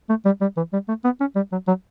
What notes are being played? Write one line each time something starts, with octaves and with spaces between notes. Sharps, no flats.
A3
G3
G3
E3
G3
A3
B3
C#4
G3
F#3
F#3